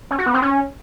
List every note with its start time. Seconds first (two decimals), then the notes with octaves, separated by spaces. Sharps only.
0.11 C#4
0.18 F#4
0.26 B3
0.34 C4
0.42 C#4